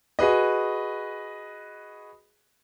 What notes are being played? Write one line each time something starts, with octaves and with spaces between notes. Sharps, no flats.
F#4 G#4 B4 D#5